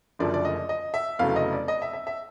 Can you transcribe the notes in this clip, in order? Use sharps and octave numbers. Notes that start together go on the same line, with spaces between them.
F#1 F#2 D3 F3 A3 D5
D5
D#5
D#5
E5
F1 E2 C#3 F#3 A3 F5
D#5
D5
D#5
E5
E5
E5